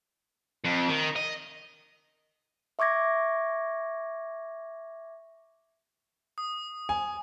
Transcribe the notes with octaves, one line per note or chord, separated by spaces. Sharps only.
F2
D#3
D#5
E5 C#6 D6 G#6 A#6
D#6
G#5